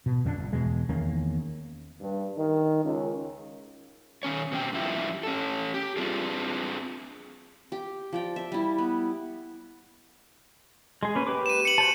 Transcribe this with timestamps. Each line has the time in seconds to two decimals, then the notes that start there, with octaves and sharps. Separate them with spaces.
0.06 B2
0.25 F2 D3 B3 D4
0.38 G1
0.53 E2 B2 G#3
0.89 E2 D#3 A#3 C#4
2.01 G2
2.37 D#3
2.85 C#2
4.23 D#3 E3 C#4 C#5
4.51 B2 C4 C#4 G5
4.73 G2 F3 E4 G4
5.23 C#4 A4
5.74 G4
5.97 C4 D4 F4 G#4
7.72 G4
8.13 F3 D5 G5
8.36 E5
8.52 G3 E4
8.78 B3
11.03 G#3 G#4
11.15 A#3 C#4 B4
11.27 G4 B4 D6
11.46 D#7 E7
11.65 C#7 F#7
11.78 F#4 C5 A5 D#7